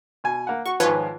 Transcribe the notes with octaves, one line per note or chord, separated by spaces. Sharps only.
B2 G#5
A#3 F#5
F#4 C#6
G#2 D#3 F3 F4 B4 C#5